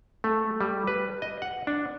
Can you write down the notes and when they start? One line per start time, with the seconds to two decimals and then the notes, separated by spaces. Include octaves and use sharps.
0.24 A3
0.61 G3
0.87 B4
1.22 D#5
1.42 F#5
1.67 D4